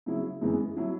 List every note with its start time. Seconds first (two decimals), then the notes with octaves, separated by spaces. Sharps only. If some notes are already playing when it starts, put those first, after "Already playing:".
0.06 C#3 F#3 E4
0.42 F#2 E3 G#3 B3
0.76 F#3 E4